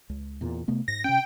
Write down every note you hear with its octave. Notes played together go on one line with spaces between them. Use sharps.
C#2
E2 A#2
C3 A3 B3
G#2 A#6
C3 C#4 G5